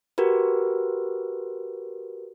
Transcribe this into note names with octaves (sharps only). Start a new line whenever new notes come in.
F#4 G4 A#4 B4